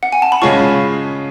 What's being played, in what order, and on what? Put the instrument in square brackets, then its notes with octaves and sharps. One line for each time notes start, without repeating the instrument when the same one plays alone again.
[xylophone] F#5
G#5
A5
B5
[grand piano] C#3 G#3 C#4 F4 [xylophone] A5 C#6